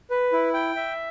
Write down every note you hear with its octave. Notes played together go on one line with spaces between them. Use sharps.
B4
E4
G5
E5